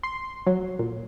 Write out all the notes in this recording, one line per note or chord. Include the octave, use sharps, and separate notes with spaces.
C6
F#3
A#2